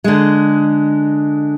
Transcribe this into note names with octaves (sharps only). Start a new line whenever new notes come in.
D3 G#3